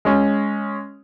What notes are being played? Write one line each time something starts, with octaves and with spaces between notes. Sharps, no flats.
G#3 C#4